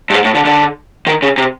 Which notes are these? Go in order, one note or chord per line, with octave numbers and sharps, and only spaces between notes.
G2
G#2
A2
D3
D3
D#3
C#3
C3